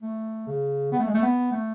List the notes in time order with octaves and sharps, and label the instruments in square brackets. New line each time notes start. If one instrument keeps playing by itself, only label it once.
[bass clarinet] A3
C#3
B3
A3
G#3
A3
B3
A3